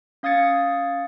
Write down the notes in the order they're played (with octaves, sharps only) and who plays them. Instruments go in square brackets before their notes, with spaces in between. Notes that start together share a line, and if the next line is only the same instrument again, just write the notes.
[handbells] C#4 F5 D#6 G#6 A6 C#7